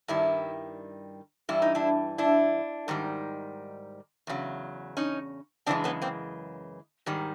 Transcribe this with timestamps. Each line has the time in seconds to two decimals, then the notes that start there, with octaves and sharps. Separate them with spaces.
0.08 G2 D#3 G3 E4
1.49 G2 E3 G3 E4
1.62 D#4
1.75 D4 E4
2.18 D4 E4
2.88 G#2 D#3 G3
4.27 E2 C#3 F#3
4.97 C#4 D#4
5.66 F#2 C#3 E3 G#3 C4 D4
5.84 B3 C#4
6.02 A#3 C4
7.06 G#2 D#3 G3